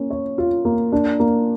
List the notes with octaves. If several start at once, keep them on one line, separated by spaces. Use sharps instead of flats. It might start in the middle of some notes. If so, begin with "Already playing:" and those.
Already playing: A#3 C#4
C#5
F4
A#3
D4
A#3